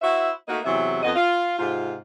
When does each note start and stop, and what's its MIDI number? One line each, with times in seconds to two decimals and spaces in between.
0.01 0.30 64
0.01 0.30 66
0.01 0.30 72
0.01 0.30 76
0.48 0.59 57
0.48 0.59 58
0.48 0.59 63
0.48 0.59 66
0.48 0.59 70
0.48 0.59 75
0.65 0.99 40
0.65 0.99 48
0.65 0.99 52
0.65 0.99 54
0.65 0.99 76
1.03 1.14 41
1.03 1.14 59
1.03 1.14 75
1.16 1.56 65
1.16 1.56 77
1.58 1.95 44
1.58 1.95 48
1.58 1.95 65